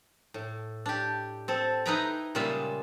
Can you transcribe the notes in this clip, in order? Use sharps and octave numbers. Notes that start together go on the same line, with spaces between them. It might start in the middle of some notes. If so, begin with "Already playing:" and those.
A2
D4 G4
C4 A4
D#4 E4 B4 D#5 G5 A#5
A#2 C#3 G3 G#3 F4 E5